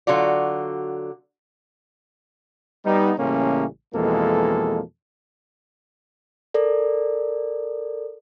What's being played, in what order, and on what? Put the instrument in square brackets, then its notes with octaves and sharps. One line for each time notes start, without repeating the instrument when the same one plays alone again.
[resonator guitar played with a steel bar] D3 F#3 F4 F#4 D5
[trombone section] G3 B3 D#4
A1 A2 C#3 G3 A#3 C#4
F2 B2 E3 G#3 A#3 A4
[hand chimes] A4 A#4 D5